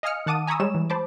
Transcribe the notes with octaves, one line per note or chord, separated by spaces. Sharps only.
D#5 F5 G#5 D#6 F6 C#7
D#3 F#5 A5 D6 D#6 D#7
G#5 A#5 B5 C#6 D#6 E6
G3 G#3 C#5 E7
E3
C5 A5 B5 D6